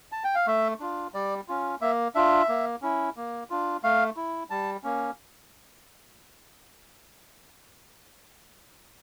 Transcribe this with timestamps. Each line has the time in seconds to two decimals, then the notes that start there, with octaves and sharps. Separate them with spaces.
0.12 A5
0.24 G5
0.35 F5
0.47 A3 E5
0.80 D4 F4
1.14 G3 D5
1.48 C#4 F4
1.81 A#3 E5
2.15 D4 F4 E5
2.49 A#3
2.82 C#4 E4
3.17 A#3
3.50 D4 F4
3.83 A3 F5
4.17 E4
4.50 G3 A5
4.84 A#3 C#4